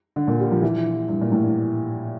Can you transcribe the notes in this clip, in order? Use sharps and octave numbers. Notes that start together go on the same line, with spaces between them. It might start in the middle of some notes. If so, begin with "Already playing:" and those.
D3
A#2
G3
F3
E3
G2
A#2
A2